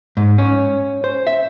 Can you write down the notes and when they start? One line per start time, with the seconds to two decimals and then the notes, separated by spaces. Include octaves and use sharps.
0.17 G#2
0.38 C#4
1.04 C5
1.27 E5